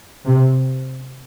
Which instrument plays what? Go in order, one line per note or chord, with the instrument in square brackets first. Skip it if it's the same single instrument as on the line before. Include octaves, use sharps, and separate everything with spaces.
[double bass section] C3